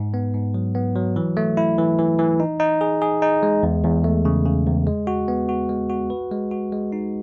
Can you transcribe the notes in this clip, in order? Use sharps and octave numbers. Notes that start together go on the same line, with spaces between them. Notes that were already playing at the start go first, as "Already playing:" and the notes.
Already playing: G#2
B3
G#2
F#3
B3
F#3
E3
A3
E4
E3
E3
E3
D#4
D#4
G#4
G#4
D#4
G#3
E2
E2
A3
C#3
C#3
E2
G#3
F#4
B3
F#4
G#3
F#4
B4
G#3
F#4
G#3
D#4